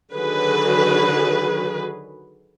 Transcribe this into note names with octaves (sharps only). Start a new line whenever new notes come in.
D3 D#3 F#3 F#4 G#4 B4